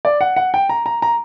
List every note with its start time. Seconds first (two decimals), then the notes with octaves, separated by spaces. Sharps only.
0.05 D5
0.21 F#5
0.36 F#5
0.54 G5
0.69 A#5
0.86 A#5
1.02 A#5